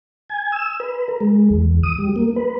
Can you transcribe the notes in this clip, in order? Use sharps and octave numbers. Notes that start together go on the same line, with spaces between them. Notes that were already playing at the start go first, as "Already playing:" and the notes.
G#5
E6
B4
A#4
G#3
E2
D#6
G3
A#3
B4